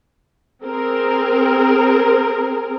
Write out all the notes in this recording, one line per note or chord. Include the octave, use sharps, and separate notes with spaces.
C4 G#4 A#4